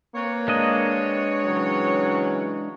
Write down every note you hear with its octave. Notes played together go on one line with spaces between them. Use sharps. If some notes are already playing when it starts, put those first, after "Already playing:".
A#3 C4 B4 C#5
G#3 D4 D#5
C#3 E3 F#3